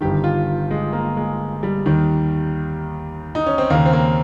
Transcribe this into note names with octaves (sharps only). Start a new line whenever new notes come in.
G1 G2 D#3 G4
F4
G#3
A#3
G#3
G3
D#2 D#3
D#4
C#4
C4
D#2 C#3 A#3
C4
A#3